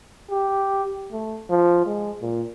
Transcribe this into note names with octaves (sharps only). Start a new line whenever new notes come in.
G4
A3
F3
G#3
A#2